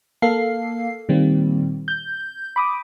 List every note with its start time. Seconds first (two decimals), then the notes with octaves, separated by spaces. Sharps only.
0.22 A#3 A4 F5 C7
1.09 A#2 D#3 G3 A#3 C4
1.88 G6
2.56 B5 D6 D#6